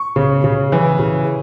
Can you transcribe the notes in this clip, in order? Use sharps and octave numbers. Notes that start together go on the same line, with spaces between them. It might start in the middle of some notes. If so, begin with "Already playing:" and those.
Already playing: C#6
C#3
C#3
E3
C#3